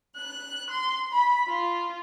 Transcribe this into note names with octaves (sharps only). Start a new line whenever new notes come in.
F#6
C6
B5
F4